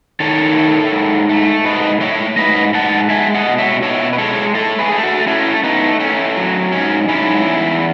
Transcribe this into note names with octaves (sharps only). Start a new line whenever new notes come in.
D#3 A4 C#5
A3
G#2
A3
G#2 B4 D#5
A3 C#5 E5
G#2 B4 D#5
G#2 F#5 A5
G#3 E5 G#5
D#5 F#5
B2
C#5 E5
B2 C#5 E5
B4
G#3 A4 C#5
A3 A4 C#5
G#4 B4
A3
F#4 A4
A3 C#4 E4
A3 B3 D#4
A3 C#4
F#3
G#2 C#4
G#2 C#4 E4
E2